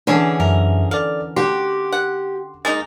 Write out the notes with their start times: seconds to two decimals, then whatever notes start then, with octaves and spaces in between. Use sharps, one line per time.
0.07 D3 E3 C#4 G#4
0.40 F#2 A#4 E5
0.91 A4 D5 F5
1.36 F#4 G4 C6
1.92 F#5
2.65 G#3 A#3 D#4 A6